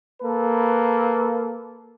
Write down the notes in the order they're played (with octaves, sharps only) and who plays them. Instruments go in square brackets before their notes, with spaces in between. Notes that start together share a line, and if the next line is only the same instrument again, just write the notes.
[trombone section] A#3 A4 B4